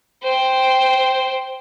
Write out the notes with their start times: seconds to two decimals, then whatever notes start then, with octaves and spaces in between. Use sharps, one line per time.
0.23 C5 G5